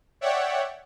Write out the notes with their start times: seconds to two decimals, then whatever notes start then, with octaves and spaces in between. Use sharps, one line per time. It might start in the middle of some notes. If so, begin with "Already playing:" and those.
0.21 C#5 D5 E5 F#5 G5